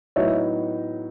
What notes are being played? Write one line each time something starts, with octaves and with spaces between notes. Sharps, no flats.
A2 F#3 B3 D#4 C#5 E5